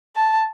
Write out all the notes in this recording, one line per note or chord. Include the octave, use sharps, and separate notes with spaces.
A5